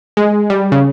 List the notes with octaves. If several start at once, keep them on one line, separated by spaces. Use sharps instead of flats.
G#3
G3
C#3